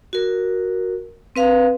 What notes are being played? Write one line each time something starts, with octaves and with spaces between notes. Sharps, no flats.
F#4 A#4
C4 B4 F5